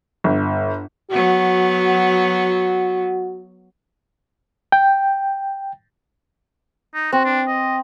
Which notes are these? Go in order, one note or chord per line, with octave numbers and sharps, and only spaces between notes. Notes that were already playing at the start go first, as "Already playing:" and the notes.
G1
F#3 B3 F#4
G5
D#4
C4 F#4
D4
D#5